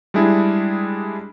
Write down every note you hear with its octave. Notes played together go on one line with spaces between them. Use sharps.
G3 G#3 D4 E4 G#4